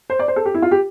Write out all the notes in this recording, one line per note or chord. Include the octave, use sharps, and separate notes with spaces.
C5
D5
C5
A4
G4
E4
F4
G4